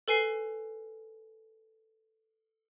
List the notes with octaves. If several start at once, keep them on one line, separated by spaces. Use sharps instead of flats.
A4 B4 G#5 C7